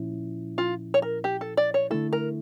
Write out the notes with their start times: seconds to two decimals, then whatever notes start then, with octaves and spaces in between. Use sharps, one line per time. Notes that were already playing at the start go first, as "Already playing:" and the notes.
Already playing: A#2 F3 C#4 E4
0.58 F4
0.94 C#5
1.02 A#4
1.24 G4
1.41 A4
1.57 D5
1.74 C#5
1.91 D3 A3 E4 A4
2.13 A#4